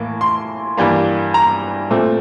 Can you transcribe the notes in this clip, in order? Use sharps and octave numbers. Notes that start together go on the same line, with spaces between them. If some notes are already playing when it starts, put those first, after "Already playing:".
Already playing: A2 E3 A#3
C6
G2 E3 G3 A#3
A#5
A#2 A3 C4